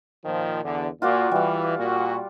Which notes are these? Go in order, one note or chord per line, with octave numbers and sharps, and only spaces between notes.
A#2 D#3 F3
E2 D3
A#2 F4 F#4 D5
E3 G3 F5
A#2 F#4